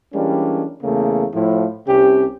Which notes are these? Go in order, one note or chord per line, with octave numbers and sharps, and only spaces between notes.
E3 G3 G#3 A#3 C#4 D4
E2 C#3 A3 A#3
A2 F3 E4
C2 C3 C#4 G4